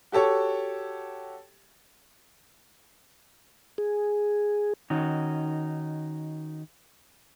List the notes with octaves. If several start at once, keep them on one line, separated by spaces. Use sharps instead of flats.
F#4 G4 A4 C#5
G#4
D#3 C#4 D#4 F#4